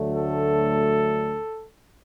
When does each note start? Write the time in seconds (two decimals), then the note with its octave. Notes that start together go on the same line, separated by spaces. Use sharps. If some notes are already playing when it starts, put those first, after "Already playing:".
Already playing: D2 D3 F#3 A3
0.11 A4